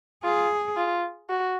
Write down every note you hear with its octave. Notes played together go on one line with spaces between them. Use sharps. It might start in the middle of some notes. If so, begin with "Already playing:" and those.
F4 G#4
F4
F#4